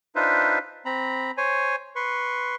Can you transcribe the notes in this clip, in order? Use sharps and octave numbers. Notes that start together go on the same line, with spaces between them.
D4 D#4 F4 B4 C5 E5
C4 A#5 B5
C5 C#5 G#5
B4 C6 C#6